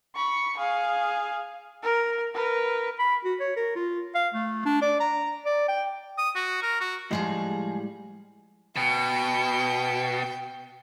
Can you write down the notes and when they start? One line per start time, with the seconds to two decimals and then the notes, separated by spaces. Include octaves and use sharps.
0.15 B5 C#6
0.57 G#4 F5
1.83 A#4
2.34 A#4 B4
2.99 B5
3.25 F#4
3.40 C#5
3.56 A#4
3.75 F4
4.15 F5
4.34 A3
4.65 D4
4.82 D5
5.00 A#5
5.46 D5
5.68 G5
6.18 D#6
6.36 F#4
6.63 A#4
6.80 F#4
7.11 A2 F3 G3 G#3 G#4 D#5
8.76 B2 G5